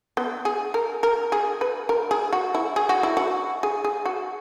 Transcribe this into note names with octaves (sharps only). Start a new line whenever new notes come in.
B3
G#4
A#4
A#4
G#4
B4
A#4
G#4
F#4
E4
G#4
F#4
E4
F#4
G#4
G#4
F#4